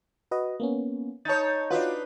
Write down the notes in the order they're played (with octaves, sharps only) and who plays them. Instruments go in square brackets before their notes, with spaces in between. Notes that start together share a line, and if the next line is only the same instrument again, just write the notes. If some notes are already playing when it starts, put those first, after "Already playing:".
[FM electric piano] F#4 B4 D#5
A#3 B3 C#4
[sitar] D#4 C#5 [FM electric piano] A5 A6
[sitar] D4 D#4 B4 [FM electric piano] F4 F#4